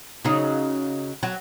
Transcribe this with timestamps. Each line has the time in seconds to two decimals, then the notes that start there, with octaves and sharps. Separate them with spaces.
0.25 C#3 F#3 D#4
1.23 F#3